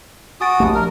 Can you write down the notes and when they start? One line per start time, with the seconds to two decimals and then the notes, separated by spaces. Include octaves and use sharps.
0.41 F#4 G#5 D#6 A6 D7
0.60 A#1 A3 G4
0.74 A#4